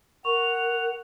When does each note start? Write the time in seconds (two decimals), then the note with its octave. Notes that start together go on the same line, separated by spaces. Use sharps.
0.25 A#4 F#5 C#6 F7